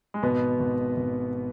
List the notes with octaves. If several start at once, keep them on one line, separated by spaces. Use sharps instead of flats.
G#3
G#1 B2 B3
G#1
G#1